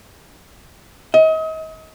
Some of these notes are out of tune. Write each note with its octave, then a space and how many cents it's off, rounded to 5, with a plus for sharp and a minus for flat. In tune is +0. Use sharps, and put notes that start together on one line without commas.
D#5 +35